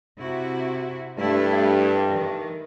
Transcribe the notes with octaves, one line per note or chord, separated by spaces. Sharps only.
C3 E4 F#4
G2 A3 E4 A4
D#3 E3